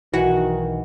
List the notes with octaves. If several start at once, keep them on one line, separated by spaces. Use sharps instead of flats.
B1 D#3 E3 F#4